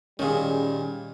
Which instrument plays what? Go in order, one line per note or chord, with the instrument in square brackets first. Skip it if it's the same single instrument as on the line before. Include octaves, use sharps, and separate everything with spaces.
[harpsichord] A#2 D#3 [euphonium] G3 [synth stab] C#4 G#4